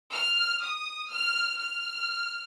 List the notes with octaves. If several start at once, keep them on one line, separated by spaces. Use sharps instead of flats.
F6
D#6
F6
F6